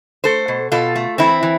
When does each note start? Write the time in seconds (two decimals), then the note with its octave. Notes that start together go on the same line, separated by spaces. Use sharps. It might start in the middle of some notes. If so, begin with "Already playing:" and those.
0.24 A3 A4 C5
0.48 B2
0.72 B2 F4 A4
0.96 A3
1.18 E3 C4 E4
1.43 E3